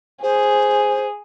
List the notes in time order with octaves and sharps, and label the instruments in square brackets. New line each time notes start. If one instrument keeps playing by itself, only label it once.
[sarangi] G#4 [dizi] C5